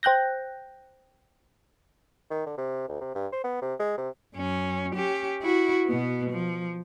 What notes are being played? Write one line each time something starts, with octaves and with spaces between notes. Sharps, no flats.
C5 G5 F#6 G6 A#6
D#3
D3
C3
D2
C3
G2
C5
B3
C3
G#3
C3
F#2 C#4
C#4 G4
E4 F#4
B2 B3
F3